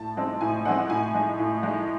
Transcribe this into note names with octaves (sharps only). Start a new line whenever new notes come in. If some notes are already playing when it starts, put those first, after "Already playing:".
Already playing: A2 A5
G#3 C4 D#4
A2 G#5
G#3 C4 D#4 F#5
A2 G#5
G#3 D#4
A2
G#3 D#4